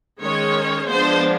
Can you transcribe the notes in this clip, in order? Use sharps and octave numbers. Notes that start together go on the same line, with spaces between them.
D#3 G#3 C#4 C#5
F3 G#3 B3 D4 C5